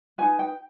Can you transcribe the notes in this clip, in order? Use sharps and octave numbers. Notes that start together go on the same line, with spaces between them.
D#4 G#4 B4 G#5
G5